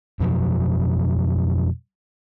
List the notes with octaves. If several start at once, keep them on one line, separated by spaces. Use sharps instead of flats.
F2 B2 F3 F#3